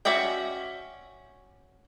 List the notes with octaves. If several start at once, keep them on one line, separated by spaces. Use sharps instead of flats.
C#4 F#4 D5 E5 G5